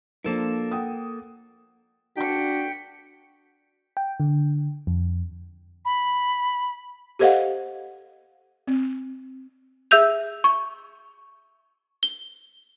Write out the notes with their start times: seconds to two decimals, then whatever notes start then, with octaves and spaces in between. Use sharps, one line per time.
0.24 F3 A#3 D4 A4 A#4 C5
0.71 F#5 G5 D#6
2.17 D4 F#4 G5 B6 C#7
3.97 G5
4.20 D3
4.87 F2
5.85 B5
7.19 G4 A4 C5 D#5 F5 F#5
8.67 C4
9.91 G#4 E5 E6 G6 F7
10.44 C#6
12.03 G7